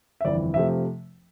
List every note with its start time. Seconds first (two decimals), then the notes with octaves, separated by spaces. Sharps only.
0.21 E5
0.25 G1 F2 E3 D5
0.54 C3 F3 A3 E5